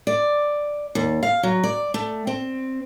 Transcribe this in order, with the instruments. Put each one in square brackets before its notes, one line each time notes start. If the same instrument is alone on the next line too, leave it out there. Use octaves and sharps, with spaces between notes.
[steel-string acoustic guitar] D5
D#2
F5
F#3
D5
A3
C4